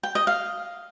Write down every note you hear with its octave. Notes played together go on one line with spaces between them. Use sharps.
G5
D#5
F5